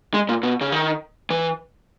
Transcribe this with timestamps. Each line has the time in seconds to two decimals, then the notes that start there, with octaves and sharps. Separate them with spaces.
0.14 G#3
0.29 A#2
0.43 B2
0.61 C#3
0.72 D#3
1.30 E3